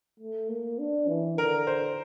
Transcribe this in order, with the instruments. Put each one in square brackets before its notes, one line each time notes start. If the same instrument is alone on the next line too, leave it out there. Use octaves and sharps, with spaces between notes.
[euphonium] A3
A#3
D4
E3
[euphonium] D3 [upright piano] A#4
[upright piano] C5